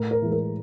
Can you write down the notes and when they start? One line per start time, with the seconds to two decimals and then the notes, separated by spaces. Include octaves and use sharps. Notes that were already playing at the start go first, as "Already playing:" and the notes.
Already playing: A2 A#4
0.11 A#4
0.22 E3 G#3
0.32 A#4